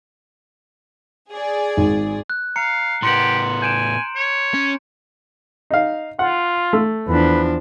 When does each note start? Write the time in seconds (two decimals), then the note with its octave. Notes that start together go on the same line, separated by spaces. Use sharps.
1.31 G#4 D5
1.77 G#1
2.30 F#6
2.56 F5 A#5 C#7
3.03 A2 B3 G4 C6 C#7 F#7
3.62 G#5 G6 D7 E7
4.16 C#5
4.54 C#4
5.70 D#4 F5
6.19 F4 F#5
6.73 A3
7.07 E2 F3 D4 B4